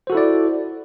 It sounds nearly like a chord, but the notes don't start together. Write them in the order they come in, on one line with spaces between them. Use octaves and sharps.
C5 F#4 A4 E4 D5